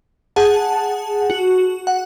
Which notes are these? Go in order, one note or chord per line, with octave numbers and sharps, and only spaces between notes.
G#4 F#5 A5
F#4
F#5